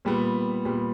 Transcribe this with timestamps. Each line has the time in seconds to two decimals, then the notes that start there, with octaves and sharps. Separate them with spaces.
0.05 A#2 G3 B3
0.65 A#2 G3 B3